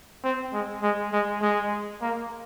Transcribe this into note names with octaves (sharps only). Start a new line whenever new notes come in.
C4
G#3
G#3
G#3
G#3
A#3